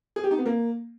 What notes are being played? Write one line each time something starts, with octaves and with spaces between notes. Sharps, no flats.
G#4
G4
D#4
B3
A#3